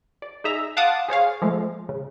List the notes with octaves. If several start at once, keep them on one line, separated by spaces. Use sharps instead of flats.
D5
D#4 G#4 E5 A#5
F5 F#5 A5 C6 D6 D#6
G#4 C5 C#5 F5
F3 G#3 A3
C#3